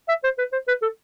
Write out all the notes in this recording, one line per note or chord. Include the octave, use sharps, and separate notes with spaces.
E5
C5
B4
C5
B4
A4